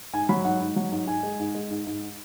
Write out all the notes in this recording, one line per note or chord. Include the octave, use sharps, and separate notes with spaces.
G#2 G#5
F#3 B5
G#2 F#5
G#2
F#3
G#2
G#2 G#5
G#3
G#2
G#3
G#2
G#2